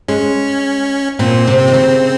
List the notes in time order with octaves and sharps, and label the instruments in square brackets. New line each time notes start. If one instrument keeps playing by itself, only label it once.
[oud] G#3 [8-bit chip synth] C#4
[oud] A#2 [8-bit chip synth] C4
[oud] C3
D#3
C#3